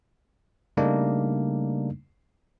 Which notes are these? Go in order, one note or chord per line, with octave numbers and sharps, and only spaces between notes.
C#3 G3 A3 A#3 D4 D#4